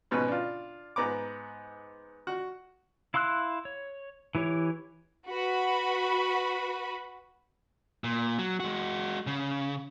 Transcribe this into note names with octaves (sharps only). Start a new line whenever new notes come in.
G#2 B2 C#4 B4
D4 F4
G#2 B3 A#5 D6
F#4
E4 F5 C6 E6 F#6
C#5
E3 E4 G4 C#5
F#4 B4 B5
A#2
F#3
G#3 F#4
C#3